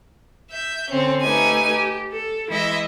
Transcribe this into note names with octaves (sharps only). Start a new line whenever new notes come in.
E5 G6
D3 C4 C#4
A3 D#4 G4 B4 G#5
G4
A4
E3 G#3 E4 D#5 E5